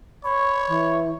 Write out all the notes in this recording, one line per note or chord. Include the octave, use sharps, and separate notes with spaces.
C#5 B5
E3